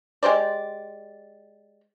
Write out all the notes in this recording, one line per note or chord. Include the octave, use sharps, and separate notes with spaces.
G#3 G4 C5 D5